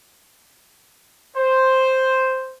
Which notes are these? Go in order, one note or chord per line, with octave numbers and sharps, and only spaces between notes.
C5